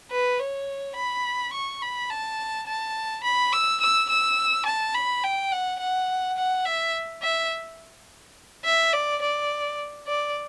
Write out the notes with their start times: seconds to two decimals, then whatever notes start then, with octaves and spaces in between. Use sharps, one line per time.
0.11 B4
0.39 C#5
0.96 B5
1.53 C#6
1.82 B5
2.10 A5
2.67 A5
3.24 B5
3.52 E6
3.81 E6
4.10 E6
4.66 A5
4.95 B5
5.24 G5
5.52 F#5
5.80 F#5
6.37 F#5
6.65 E5
7.22 E5
8.65 E5
8.93 D5
9.22 D5
10.07 D5